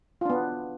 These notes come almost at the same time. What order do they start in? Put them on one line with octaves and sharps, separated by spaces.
F4 D4 B3